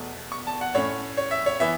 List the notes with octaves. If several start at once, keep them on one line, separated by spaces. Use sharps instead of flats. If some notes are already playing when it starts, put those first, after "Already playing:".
Already playing: E2 B2 A3
C#6
A5
F#5
A2 A3 C#4 C#5
C#5
E5
C#5
E3 B3 E5